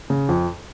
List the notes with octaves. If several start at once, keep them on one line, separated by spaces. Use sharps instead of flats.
C#3
F2